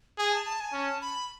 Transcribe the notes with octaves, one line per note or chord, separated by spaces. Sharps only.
G#4 G#5
A5
A5
G#5
C#4 A5
B5